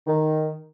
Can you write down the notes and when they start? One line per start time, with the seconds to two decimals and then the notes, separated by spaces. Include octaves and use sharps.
0.07 D#3